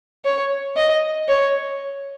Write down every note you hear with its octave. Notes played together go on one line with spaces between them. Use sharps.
C#5
D#5
C#5